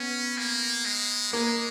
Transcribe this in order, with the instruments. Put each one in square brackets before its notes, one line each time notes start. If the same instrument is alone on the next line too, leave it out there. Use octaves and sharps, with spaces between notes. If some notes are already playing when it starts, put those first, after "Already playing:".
Already playing: [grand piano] B3 [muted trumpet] C#4
[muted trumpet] A#3
G#3
[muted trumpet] G#3 [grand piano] A#3